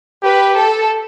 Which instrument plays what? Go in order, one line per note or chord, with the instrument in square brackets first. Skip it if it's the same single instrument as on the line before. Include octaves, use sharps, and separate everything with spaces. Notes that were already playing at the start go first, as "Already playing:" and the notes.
[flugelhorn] G4 [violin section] B4
[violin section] A4